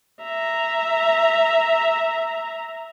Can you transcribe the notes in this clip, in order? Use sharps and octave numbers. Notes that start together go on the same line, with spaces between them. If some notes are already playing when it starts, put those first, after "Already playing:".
E5 A#5